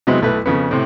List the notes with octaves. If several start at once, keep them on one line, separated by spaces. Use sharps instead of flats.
C3 F#3 G#3 B3 E4
B1 A3 E4 B4
F2 C#3 B3
A2 C3